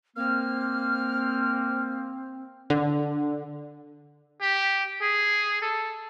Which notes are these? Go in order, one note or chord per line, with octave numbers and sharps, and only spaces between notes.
A#3 C4 F6
D3
G4
G#4
A4